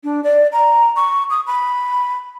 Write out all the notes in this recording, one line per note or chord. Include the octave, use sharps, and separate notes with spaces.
D4
D5
A#5
C#6
D#6
B5